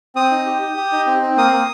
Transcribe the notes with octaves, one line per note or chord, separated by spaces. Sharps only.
C4 D#6
D#4
G4
G4
G4
D#4
C4
C4
A#3 D#6
A#3